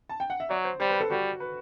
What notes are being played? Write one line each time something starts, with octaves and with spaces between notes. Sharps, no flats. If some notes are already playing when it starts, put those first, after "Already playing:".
A5
G5
F#5
E5
F#3 D5
C5
G3 C5
B4
A4
G3 F#4
B4